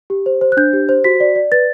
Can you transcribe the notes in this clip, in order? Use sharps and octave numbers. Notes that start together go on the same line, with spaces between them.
G4
C5
C5
F#6
D4 G6
G4
C5
F#4 B6
D5
D5
B4 A6